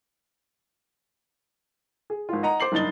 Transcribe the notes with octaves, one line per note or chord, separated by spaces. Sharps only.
G#4
G#1 F4
D#5 F#5 A#5
C5 D6 C7 F#7
F#1 G2 D#4 A6 G7